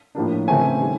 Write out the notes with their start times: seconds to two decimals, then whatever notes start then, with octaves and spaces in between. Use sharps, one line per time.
0.15 A2 F3 A#3 D4
0.48 C#3 E3 A3 C4 G#5
0.81 D#3 G3